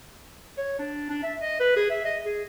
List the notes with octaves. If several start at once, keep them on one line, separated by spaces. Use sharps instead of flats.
C#5
D4
D4
E5
D#5
B4
G#4
E5
D#5
G#4